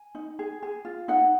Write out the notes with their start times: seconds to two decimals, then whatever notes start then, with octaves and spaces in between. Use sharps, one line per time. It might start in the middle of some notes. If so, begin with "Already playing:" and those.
Already playing: G#5
0.15 D#4
0.39 G#4
0.63 G#4
0.85 F4
1.08 D#4 F#5